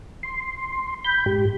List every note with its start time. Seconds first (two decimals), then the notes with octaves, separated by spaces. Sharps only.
0.23 C6
1.05 B5 G6
1.26 G#2 G4